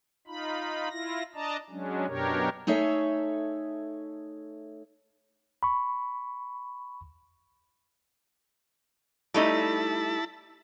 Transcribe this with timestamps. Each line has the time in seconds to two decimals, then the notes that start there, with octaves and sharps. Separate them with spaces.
0.27 D#4 F4 B5
0.90 E4 F4 A#6
1.35 D4 D5 D#5 A5 A#5
1.70 F#3 G#3 C#4 D4
2.07 F#2 B2 D4 G4 A#4 C#5
2.67 A3 D#4 G#4 A4 C#5 E5
5.63 B5 C#6
9.34 G3 A3 D#4 E4 A5